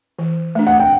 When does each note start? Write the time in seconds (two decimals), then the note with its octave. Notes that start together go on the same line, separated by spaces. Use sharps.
0.19 E3
0.55 A3 D4
0.67 F#5
0.80 G5